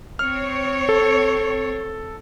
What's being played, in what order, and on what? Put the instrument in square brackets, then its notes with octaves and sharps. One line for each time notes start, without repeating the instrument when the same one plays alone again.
[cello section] C4 C#5 [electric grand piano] F6
[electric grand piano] A4